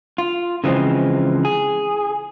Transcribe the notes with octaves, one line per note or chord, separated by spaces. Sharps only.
F4
C#3 E3 F3 G#3 C4
G#4